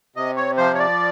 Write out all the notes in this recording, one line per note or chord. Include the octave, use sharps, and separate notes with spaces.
C3 D#5
C#5
F3 C5
C#5
D5